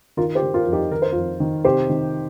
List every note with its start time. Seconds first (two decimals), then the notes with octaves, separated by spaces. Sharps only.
0.17 D#3 F4 A#4
0.35 G4 C5
0.42 D#3
0.54 F4 A#4
0.67 F2
0.72 D#4 G4
0.91 D#3 A#4
1.02 C5
1.12 F2 F4 A#4
1.40 D#3
1.65 C3 G4 C5
1.90 D#3